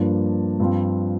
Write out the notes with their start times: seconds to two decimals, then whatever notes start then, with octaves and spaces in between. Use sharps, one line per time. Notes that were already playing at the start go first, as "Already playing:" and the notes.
Already playing: G2 F3 A#3 D4
0.60 G2 F3 C4 F4